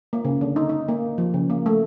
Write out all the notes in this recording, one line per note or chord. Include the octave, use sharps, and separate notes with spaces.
A#3
C#3
D3
D#4
D#4
A#3
F3
C#3
A#3
A3